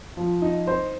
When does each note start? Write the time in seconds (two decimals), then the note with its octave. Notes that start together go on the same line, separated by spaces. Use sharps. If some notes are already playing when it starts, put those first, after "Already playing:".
0.17 F3
0.42 D#4
0.67 C5